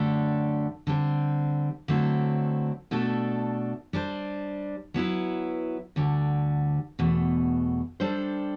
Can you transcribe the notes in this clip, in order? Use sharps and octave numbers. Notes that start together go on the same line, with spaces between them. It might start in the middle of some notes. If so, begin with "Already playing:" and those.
Already playing: F#2 D3 A3 D4 G4
D3 G3 C4
D3 F#3 A3 C4 E4
B2 A3 D4 A4
G3 D4 A4 C5
F#3 B3 E4 B4
D2 D3 G3
E2 B2 A3
G3 D4 A4 C5